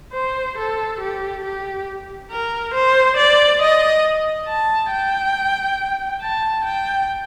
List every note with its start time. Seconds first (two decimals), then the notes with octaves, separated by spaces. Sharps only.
0.13 C5
0.57 A4
1.00 G4
1.44 G4
2.30 A#4
2.74 C5
3.17 D5
3.61 D#5
4.48 A5
4.91 G5
6.21 A5
6.65 G5